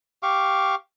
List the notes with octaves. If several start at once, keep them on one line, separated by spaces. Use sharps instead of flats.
G4 F5 C#6 D6